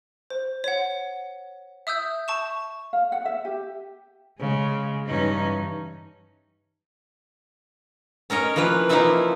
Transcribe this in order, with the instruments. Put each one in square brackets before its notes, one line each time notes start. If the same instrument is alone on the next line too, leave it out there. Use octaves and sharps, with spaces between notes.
[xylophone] C5
C#5 F#5
E5 D#6 E6 G6
A5 C#6 E7
[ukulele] F5
F#5
E5
G4
[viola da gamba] C#3 [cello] G#3
[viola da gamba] G2 C#4 [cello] E3 D#4
[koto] C#4 A#4 C#5 D#5
E3 F3 A#3 B4
F3 A#3 C#4 D#4 E4 E5